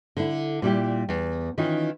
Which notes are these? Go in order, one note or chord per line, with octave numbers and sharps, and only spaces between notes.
D3 E4
A#2 G3 E4 G4
E2
D#3 E3 C#4 D#4 F4